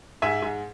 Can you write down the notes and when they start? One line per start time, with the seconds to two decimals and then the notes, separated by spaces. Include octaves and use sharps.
0.22 G#2 E5 G#5
0.42 G#2